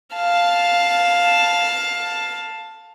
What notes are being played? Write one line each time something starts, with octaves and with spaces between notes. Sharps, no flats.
F5 A5